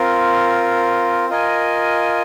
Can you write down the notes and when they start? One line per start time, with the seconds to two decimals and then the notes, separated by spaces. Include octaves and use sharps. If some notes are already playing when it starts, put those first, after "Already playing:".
Already playing: C4 F4 A#4
1.29 F4 A#4 D#5 G#5